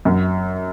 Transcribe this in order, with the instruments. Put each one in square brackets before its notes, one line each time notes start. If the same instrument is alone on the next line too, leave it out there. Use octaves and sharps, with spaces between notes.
[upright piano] F#2